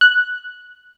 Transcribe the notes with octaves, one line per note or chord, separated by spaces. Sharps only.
F#6